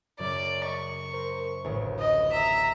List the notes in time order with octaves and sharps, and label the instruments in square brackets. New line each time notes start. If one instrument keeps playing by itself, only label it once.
[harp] F#2 C#3 [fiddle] D5
[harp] D#5 [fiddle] C#6
[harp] A#4 C5
A1 D2
[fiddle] D#5
[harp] D#5 [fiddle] E5 A#5